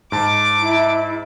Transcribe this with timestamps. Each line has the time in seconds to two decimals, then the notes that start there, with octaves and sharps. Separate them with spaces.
0.12 G#2 A5 D6
0.59 E4